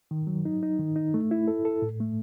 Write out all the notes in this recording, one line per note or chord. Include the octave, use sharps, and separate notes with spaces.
D#3
F#3
D#4
D#4
D#3
D#4
A3
E4
A4
A4
A2
A3